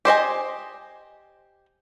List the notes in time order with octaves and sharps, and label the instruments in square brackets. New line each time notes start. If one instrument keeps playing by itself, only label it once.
[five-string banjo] G4 C5 D#5 G#5